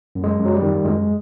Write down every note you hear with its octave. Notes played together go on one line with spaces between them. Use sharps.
F#2
G#3
F#2
F#3
G3
D#3
F#2 G#3